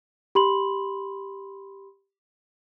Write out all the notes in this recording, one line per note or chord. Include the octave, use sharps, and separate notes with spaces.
G4 B5 C6 F#7